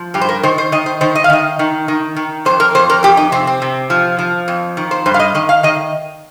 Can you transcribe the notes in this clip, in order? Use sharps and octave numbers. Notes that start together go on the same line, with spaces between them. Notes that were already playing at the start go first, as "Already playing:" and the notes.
Already playing: F3
G2 G4
C5
A#4
D#3 C5
C5
D#3 D#5
C5
D#3 C5
D#5
F5
D#3 D#5
D#3
D#3
D#3
F2 C5
A#4
F2 C5
A#4
F2 G4
D#4
C3 C4
C4
C3
F3
F3
F2
D#3
C5
G2 C5
F5
D#5
D#3 D#5
F5
D#3 D#5